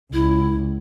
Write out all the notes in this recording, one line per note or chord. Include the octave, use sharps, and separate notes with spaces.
C#2 E4